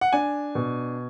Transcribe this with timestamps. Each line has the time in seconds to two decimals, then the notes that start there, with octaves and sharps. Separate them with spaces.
0.01 F#5
0.13 D4 G#5
0.55 B2